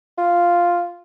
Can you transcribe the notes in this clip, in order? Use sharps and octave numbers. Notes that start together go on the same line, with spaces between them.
F4